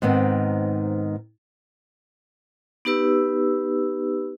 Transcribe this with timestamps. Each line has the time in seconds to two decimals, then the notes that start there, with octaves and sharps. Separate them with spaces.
0.02 G#2 D#3 B3 C4
2.85 B3 D#4 G4 B4 E6